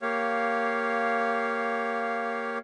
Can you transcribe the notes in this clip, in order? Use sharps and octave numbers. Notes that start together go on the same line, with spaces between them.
A#3 G4 C#5 F5